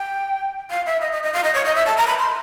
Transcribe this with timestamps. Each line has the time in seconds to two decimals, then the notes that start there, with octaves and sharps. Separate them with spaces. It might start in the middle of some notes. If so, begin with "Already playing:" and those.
Already playing: G5
0.71 F5
0.86 E5
1.01 D#5
1.12 D#5
1.23 D#5
1.34 F5
1.44 D#5
1.54 C#5
1.65 D#5
1.75 E5
1.86 A5
1.97 A#5
2.07 B5
2.19 C6